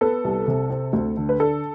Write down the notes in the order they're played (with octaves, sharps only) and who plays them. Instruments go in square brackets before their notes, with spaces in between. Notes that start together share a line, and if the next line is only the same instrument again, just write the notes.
[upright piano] B3 [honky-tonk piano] A4
[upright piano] C2
C3
C4
D2
D3
[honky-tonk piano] B4
[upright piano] D4 [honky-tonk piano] A4